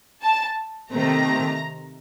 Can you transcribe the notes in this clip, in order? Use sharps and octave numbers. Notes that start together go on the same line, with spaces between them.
A5
C3 D#3 A3 C4 A#5